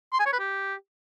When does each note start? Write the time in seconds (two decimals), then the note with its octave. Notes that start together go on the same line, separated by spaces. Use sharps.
0.13 C6
0.20 G#5
0.26 C#5
0.33 B4
0.39 G4